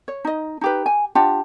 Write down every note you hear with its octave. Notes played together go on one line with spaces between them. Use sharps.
C#5
D#4 D#5
D#4 G4 B4
G#5
D4 F4 G4 F#5